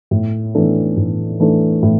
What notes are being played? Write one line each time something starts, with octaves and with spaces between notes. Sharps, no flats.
A2
E3 A3 D4 A4
A2
E3 A3 D4 A4
A2